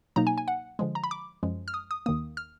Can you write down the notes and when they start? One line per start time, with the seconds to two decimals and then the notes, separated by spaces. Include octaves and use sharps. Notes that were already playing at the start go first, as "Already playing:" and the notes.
0.16 B2 F#3 A#3 D#4 A#5
0.27 G#5
0.38 G#5
0.48 F#5
0.79 D3 F3 G#3
0.95 A#5
1.04 B5
1.11 D6
1.43 F#2 F3 G#3
1.68 F6
1.74 D#6
1.91 D#6
2.06 D#2 D#3 A#3 D#6
2.37 F6